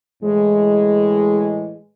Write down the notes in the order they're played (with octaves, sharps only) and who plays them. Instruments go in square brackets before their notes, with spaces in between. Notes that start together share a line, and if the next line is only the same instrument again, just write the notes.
[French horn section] A2 E3 G#3